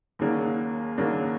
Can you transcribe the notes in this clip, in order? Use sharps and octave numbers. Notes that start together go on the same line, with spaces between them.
D#2 C#3 F#3 A#3 D4
D#2 C#3 F#3 A#3 D4